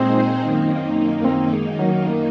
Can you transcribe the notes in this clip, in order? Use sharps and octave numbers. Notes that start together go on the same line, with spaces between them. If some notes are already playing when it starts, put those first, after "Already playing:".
Already playing: A#2 G#3 C4 D#4 G#4 C5
F#2 D#3 A#3 D#4
A#3
C4
G#3
F#3
A#3